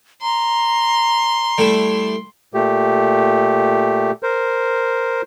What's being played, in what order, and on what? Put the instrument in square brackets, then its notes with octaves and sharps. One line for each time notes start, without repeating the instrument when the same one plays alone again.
[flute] A#5 [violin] C6
[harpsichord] G3 A3 E4
[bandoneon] A#2 A3 G4
A#4 C5